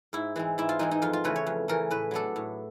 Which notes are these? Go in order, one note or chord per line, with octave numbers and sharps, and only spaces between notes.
G#2 E4
E3 G#3 C4
G#2 E4
F4
E3 G#3 C4 D#4
D#4
F2 F4
F4
C#3 E3 A3 B4
C#5
F2
C#3 E3 A3 A#4
A2 B4
F#3 B3 D4 A4
A2